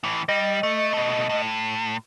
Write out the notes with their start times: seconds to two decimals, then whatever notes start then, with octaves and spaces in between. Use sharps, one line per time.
0.04 A2 E3
0.29 G3 D#5
0.63 A3
0.94 B2 A3
1.29 A2